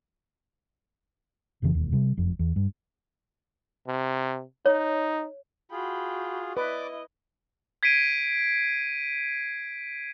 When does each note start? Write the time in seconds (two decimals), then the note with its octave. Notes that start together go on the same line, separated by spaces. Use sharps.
1.62 F1 F2 C#3 E3
1.75 E1 D#2
1.93 C3 G3
2.17 F#1 F2
2.39 E2
2.56 G2
3.87 C3
4.66 D#4 C#5
5.71 F4 F#4 G#4 G5 B5
6.57 E4 B4 D5 D#5 D6
7.83 G#6 B6 C7 D7 D#7